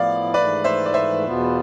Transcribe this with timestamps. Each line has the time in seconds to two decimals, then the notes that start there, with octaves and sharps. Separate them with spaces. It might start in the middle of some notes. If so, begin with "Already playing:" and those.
Already playing: A2 F3 B3 E4 D5 F5
0.34 G#2 E3 A3 B4 D5
0.64 C5 E5
0.86 D5
0.94 C5 E5
1.25 E2 B2 B3 F4